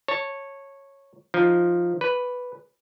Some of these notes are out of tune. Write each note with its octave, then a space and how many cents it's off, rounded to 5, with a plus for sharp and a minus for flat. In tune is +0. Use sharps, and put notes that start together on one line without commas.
C#5 -10 A5 +15
F3 +0 D#4 +0
B4 +0 D5 -35